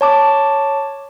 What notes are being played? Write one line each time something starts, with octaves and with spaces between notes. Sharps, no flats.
C#5 A5 D6